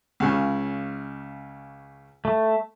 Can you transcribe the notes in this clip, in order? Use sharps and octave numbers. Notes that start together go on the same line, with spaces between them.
C#2 C#3
A3